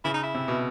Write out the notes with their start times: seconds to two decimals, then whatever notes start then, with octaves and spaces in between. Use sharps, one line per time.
0.04 C#3 E4
0.14 D#4
0.23 E4
0.35 C3
0.48 B2